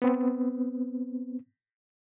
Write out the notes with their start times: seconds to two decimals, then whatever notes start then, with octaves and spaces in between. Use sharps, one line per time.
0.02 B3 C4